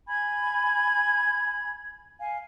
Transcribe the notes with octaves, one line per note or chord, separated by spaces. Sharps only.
G#5 B5 G#6
F5 G#5